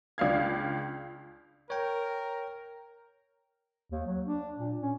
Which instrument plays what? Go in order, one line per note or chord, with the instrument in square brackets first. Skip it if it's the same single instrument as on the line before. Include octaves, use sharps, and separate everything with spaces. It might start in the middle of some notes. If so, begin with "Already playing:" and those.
[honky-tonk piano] C#2 D4 F5 G#6
[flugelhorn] A#4 [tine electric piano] C#5 G5
[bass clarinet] D#2
F#3
D4
A#2
C#4